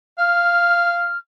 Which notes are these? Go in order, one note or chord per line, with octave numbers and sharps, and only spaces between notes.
F5 F6